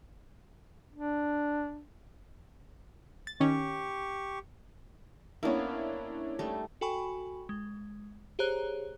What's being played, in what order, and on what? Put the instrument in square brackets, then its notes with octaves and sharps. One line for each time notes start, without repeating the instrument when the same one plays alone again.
[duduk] D4
[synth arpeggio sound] A6
[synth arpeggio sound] D#3 C#4 [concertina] G4 C#6
[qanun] A#3 B3 [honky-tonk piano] C#4 D4 E4
[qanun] G3 A3 D#4
[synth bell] F#4 A4 G5 G#5 B5 C#6
G#3
G4 G#4 C5 C#5 A#5 F#6